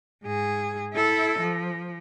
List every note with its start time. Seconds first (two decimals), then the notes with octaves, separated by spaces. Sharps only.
0.24 G#2 G#4
0.93 E4 A4
1.39 F3